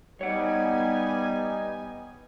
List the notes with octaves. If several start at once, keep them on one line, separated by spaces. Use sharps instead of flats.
G3 B3 D#4 C#5 F#5 G#5